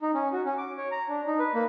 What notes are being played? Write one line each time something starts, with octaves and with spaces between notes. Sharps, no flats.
D#4
C#4
F#4
C#4
D6
C#5
A#5
D4
D#4
B4
A#3